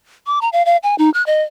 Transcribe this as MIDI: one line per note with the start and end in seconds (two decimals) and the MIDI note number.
0.27 0.41 86
0.41 0.49 82
0.53 0.63 77
0.66 0.77 77
0.83 0.95 80
0.98 1.10 63
1.14 1.24 90
1.26 1.43 75